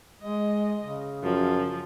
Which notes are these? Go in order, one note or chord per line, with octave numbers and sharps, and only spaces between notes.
G#3 D#5
C#3
F#2 F3